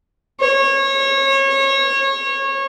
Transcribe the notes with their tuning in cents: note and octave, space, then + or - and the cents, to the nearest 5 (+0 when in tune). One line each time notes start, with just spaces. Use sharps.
C#5 -25